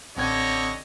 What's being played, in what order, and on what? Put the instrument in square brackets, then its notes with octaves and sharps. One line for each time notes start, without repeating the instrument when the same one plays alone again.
[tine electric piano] A1 C4 G#6 [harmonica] D3 G4 D#5 [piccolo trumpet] C#5